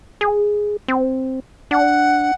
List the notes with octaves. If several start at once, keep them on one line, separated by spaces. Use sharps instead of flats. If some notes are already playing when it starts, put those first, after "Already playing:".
G#4
C4
D4 F#5